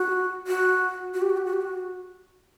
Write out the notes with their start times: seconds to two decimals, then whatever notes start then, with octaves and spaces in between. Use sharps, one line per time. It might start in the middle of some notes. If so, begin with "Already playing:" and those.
Already playing: F#4
0.47 F#4
1.14 F#4
1.22 G4
1.30 F#4
1.37 G4
1.45 F#4
1.53 G4
1.61 F#4